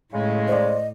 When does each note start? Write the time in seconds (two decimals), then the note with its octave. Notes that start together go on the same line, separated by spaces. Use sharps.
0.13 A2 C#3 G#3
0.48 C5 D5 D#5